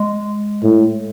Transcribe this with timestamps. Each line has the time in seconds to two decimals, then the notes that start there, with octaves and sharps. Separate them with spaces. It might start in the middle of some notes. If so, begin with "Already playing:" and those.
Already playing: G#3
0.63 A2